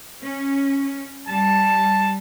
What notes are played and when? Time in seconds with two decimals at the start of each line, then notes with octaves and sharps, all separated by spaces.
0.22 C#4
1.28 G3 A5